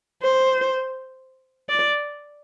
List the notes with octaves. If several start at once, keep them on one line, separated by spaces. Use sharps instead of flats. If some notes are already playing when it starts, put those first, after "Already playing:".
C5
D5